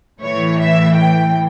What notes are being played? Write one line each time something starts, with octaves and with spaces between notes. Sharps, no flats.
A2 E3 C#5
E5
G5